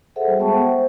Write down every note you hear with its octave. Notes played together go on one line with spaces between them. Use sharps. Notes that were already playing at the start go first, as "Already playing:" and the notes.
G#4 A4 C5 E5 F#5
G3 F#4 G#4 G5
G#3 B3 E5 A5 C#6
C5 E5 F#5 G5
C5